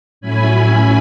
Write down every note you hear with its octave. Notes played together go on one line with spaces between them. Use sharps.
A2 F#3 C#4 E4 G#5 B5